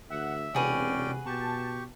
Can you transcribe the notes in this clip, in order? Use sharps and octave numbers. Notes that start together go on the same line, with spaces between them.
D2 E5 F#5
E1 C3 C#4 F#4 G#4 B4 D5 G5
B2 G4 A5 C#6